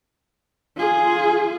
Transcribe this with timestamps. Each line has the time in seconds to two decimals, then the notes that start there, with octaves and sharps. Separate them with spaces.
0.77 F4 G#4